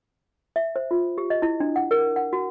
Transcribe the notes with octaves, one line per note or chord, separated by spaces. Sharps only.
E5
C5
F4
G4
D#5
E4
D4
F#5
A#4
F#5
F#4